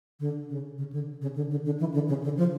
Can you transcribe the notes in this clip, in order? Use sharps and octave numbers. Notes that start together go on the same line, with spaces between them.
D3
C#3
C#3
D3
C#3
D3
D3
D3
E3
D3
C#3
D3
F3